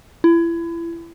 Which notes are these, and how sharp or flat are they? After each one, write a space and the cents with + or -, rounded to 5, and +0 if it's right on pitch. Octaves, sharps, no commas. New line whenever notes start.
E4 +30